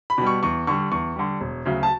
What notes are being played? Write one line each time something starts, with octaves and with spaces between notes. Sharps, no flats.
B5
B2 G3
C#6
E2 C#6
D3 G3 C#6
E2 C#6
D3 G3
E1
D2 C#3 F#3
A5